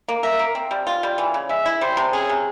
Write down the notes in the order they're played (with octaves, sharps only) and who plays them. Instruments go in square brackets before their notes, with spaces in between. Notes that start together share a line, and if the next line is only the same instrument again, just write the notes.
[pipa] A#3
[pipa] A#4 [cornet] E5
[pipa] A#3
C4
G3
F4
G3
E3
C#3
[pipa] G#3 [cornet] E5
[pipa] E4
[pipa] G3 [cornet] C5
[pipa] C3
[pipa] C#4 [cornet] G#4
[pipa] C3